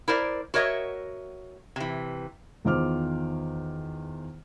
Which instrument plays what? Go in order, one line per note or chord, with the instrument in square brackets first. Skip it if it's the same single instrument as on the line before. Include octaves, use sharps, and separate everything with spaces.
[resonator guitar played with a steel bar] E4 A#4 C5 D5
F#4 A#4 C#5 D#5 E5
C3 E3
[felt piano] E2 D#3 F4 C5 D6 F6